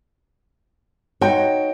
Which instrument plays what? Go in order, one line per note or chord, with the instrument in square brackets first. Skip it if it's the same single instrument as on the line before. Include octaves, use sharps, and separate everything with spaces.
[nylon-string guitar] D#4 C#5 [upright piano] F#4 G5